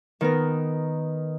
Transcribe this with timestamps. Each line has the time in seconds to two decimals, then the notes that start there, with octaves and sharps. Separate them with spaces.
0.21 D#3 B3 A#4